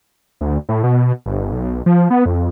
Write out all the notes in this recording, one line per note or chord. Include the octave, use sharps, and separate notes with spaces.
D2
A2
B2
G1
B1
F3
B3
F2